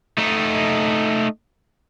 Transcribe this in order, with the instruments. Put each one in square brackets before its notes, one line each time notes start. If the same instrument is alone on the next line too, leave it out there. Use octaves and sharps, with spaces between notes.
[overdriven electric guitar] A3 D#4